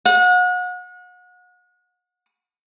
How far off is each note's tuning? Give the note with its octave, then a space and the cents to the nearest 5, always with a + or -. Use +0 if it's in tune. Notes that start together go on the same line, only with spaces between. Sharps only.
F#5 -35